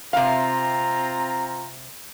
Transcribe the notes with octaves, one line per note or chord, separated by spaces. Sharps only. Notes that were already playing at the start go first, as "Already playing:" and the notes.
C3 C4 F4 F5 A#5